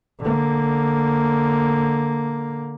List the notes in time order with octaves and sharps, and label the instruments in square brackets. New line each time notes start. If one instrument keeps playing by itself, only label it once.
[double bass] D3 A#3